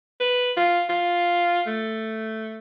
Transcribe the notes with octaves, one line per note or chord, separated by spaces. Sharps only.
B4
F4
F4
A3